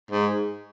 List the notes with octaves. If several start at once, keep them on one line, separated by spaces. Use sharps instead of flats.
G#2